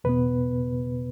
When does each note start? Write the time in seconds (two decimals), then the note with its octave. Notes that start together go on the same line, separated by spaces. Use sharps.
0.04 E2 B2 B3 B4